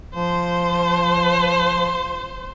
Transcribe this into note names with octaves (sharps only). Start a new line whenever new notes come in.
F3 C5